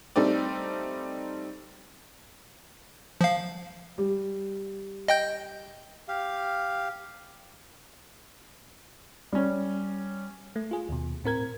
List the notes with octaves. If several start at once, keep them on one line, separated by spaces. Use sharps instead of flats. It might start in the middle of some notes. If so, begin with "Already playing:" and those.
G3 A3 C4 D#4 D5
F3 F5
G3
D#5 G5 G6
G4 F5
G3 C#4
A3
F4 G#4
D#2 B2
A2 C4 A#4 G#6